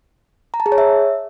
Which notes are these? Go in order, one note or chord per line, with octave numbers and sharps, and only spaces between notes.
A#5
A5
G#4
C#5
E5